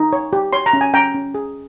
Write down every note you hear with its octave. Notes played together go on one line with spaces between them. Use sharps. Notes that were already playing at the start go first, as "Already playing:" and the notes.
Already playing: D#4
C#5
G4
C#5 C6
A#5
C#4
G#5
C#4 G5 A#5
C#4
G#4